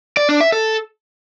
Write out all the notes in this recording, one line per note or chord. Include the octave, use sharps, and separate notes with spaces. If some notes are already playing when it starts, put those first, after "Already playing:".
D5
D4
E5
A4